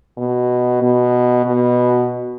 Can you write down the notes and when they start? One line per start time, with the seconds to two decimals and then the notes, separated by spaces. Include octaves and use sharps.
0.18 B2
0.82 B2
1.46 B2